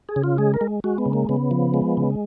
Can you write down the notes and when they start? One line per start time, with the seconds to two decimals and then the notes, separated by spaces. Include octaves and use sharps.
0.09 G#4
0.16 C#3
0.24 F4
0.38 G#3 G#4
0.54 A#4
0.61 G#3
0.84 G#3 F#4
0.98 B3
1.06 C#3
1.13 A#3
1.29 C#3 B3
1.51 F3
1.74 G#3
1.97 C#3